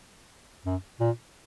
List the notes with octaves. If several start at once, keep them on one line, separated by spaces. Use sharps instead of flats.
F#2
A#2